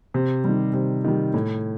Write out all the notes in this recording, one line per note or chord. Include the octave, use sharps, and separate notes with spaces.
C3
D#3 G3
C3
D#3 G3
A2